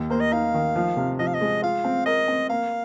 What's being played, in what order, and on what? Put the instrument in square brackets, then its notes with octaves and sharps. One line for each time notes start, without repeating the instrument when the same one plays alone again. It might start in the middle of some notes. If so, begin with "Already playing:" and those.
Already playing: [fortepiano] D#2
[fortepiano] A#3 [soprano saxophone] C5
[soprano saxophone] D#5
[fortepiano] D#4 [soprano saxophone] F5
[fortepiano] D#3
F3
C3
[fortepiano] F3 [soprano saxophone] D#5
[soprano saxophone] F5
D#5
[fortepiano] G#3
[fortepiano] F4 [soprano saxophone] F5
[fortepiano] C4
[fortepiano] A#4 [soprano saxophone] D#5
[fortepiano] C4
[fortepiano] A#3 [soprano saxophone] F5